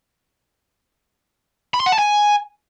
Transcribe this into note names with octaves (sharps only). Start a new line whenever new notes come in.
B5
C6
F#5
A5
G#5